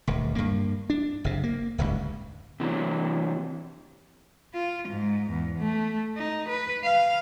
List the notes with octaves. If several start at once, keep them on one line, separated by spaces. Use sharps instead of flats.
D#1 D2
G2 A#3
D4
F#1 C3
A#3
D1 G1 C#2 G#2
C3 E3 F#3
F4
G#2
E2
A3
D#4
B4
F5